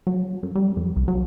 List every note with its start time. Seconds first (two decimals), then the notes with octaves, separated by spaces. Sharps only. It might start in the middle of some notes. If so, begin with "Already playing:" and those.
0.07 F#3
0.43 F#2
0.55 G3
0.77 F2
0.96 C2
1.08 F#3